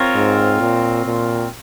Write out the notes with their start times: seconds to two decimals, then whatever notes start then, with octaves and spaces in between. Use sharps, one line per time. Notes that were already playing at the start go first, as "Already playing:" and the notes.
Already playing: C4 F4 A#4 C#5
0.15 G#2
0.60 A#2
1.06 A#2